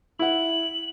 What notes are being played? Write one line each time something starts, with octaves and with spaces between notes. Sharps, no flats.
E4 F#5 F#7